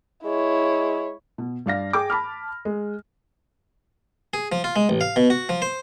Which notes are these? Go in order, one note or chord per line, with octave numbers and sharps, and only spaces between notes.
G#3 E4 C#5
B2
G2 D5 F5 A#6
G#4 G5 D6
A5 B5 D6 F6
G#3
G#4
F3
F4
G#3
A1
F5
B2
F#4
F3
C5